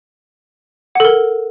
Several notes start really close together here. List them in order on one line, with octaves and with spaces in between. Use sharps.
F#5 A4 A#4